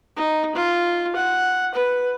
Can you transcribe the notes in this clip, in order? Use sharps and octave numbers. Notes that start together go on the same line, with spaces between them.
D#4
F4
F#5
B4